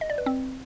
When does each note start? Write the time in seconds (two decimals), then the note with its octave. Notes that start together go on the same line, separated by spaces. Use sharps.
0.01 D#5
0.10 D5
0.18 B4
0.26 C4